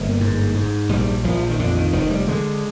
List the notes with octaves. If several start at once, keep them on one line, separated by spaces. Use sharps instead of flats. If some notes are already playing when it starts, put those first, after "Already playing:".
Already playing: G1 A#3
G#2
G#2
A#1 G3
A#1 F3
D#3
F2 D3
D#3
F1 D#3
G3
D3 G#3